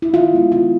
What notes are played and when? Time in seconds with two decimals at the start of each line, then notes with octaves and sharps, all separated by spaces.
0.02 E4
0.14 D#3 F4
0.33 G#3 B3 E4
0.52 D#3 F4